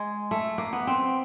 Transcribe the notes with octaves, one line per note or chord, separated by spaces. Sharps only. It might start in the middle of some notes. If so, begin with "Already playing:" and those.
Already playing: G#3
A3
A#3
B3
C4